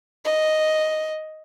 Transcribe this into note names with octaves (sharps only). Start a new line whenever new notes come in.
D#5